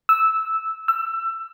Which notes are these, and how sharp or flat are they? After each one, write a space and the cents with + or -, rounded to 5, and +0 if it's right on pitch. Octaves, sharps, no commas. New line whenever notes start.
E6 -10
E6 +20